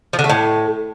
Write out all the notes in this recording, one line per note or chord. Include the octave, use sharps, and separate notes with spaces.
F3
D3
A3
A2